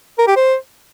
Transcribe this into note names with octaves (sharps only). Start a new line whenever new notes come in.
A#4
G4
C5